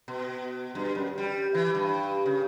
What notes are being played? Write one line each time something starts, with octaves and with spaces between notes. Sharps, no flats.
B2
G2
F#2
G3
E3
G2
C#3